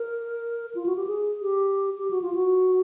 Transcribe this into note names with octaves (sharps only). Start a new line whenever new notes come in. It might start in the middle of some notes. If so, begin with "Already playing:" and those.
Already playing: A#4
F4
F#4
G4
G#4
G4
G4
F#4
F4
F#4